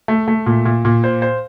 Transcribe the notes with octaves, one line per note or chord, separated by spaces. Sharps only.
A3
A3
A#2
A#2
A#2
C5
C5